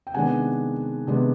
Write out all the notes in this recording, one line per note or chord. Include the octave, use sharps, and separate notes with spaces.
G5
C3 D#3 G#3 B3 D4 F#5 G#5
C3 D#3 G#3 B3 D4